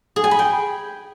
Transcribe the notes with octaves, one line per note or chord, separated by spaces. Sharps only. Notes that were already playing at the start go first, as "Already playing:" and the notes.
G#4
G#5
B5
G5